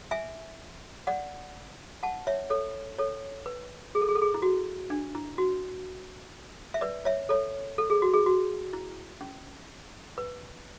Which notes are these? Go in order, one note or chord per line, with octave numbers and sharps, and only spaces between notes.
E5 G#5
D5 F#5
F#5 A5
C#5 E5
A4 C#5
A4 C#5
B4
G#4
A4
G#4
A4
G#4
E4
F#4
D4
E4
F#4
E5
B4 D5
C#5 E5
A4 C#5
A4
G#4
F#4
G#4
F#4
E4
C#4
B4